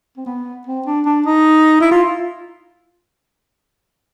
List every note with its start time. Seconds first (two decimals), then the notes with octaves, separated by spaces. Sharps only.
0.17 C4
0.26 B3
0.67 C4
0.86 D4
1.06 D4
1.26 D#4
1.81 E4
1.91 F4